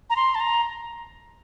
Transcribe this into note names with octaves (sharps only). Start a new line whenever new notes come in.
A#5
C6
A5
A#5